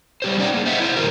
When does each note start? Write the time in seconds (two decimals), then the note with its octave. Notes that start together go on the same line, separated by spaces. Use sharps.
0.22 G3 G4 C5
0.38 C#4 D#4 D5 E5 F#5 G5
0.54 A#3 G#4
0.65 C4 C5 D#5 E5 F#5
0.80 E4 C5
0.96 A#2 D#3 A3 F#4 G4 A#4